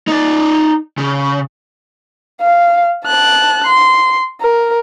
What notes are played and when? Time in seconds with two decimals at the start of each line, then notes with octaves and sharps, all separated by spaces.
0.08 D#4 D5
0.98 C#3
2.41 F5
3.05 A5 F#6
3.67 C6
4.41 A#4